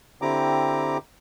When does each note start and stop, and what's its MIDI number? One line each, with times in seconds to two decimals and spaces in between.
0.22 0.98 50
0.22 0.98 60
0.22 0.98 64
0.22 0.98 67
0.22 0.98 82
0.22 0.98 86